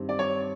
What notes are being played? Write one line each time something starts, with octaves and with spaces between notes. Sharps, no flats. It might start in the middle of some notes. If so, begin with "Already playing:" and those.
Already playing: G2 D#3 G3 C4
D5
C#5